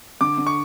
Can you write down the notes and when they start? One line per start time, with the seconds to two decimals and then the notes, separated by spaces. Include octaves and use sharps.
0.21 D3 D6
0.38 D3
0.47 C#6